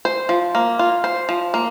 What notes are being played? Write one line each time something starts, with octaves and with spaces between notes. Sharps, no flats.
C5
F3
A#3
F4
C5
F3
A#3